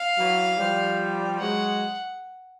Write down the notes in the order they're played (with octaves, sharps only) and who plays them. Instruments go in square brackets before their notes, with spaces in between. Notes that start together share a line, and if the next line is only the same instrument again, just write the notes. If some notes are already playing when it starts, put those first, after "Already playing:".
Already playing: [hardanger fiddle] F5
[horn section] E3 F#3
F3 G3
[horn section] F#3 G#3 [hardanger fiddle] F#5